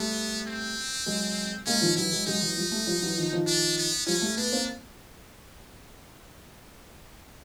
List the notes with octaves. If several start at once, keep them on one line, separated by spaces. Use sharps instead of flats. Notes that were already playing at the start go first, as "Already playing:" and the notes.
Already playing: G3 A3 B3
C4
F#3 G#3
G#3 A#3 C#4
D#3 F3
E3 F#3 E4
F#3 G#3
F#3 G#3 D#4
E3 F#3
F3 G3
G3 A3
F3 G3
E3 F#3
D#3 F3
D#3 F3
D4
B3
F3 G3 C#4
G3 A3
A3 B3 D4
A#3 C4